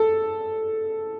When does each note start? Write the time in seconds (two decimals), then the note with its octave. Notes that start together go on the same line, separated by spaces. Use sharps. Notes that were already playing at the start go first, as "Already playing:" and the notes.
Already playing: A4